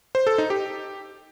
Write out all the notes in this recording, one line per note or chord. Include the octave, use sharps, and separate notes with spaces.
C5
A4
D#4
G4